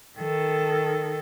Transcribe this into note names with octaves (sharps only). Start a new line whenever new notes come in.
D#3 A4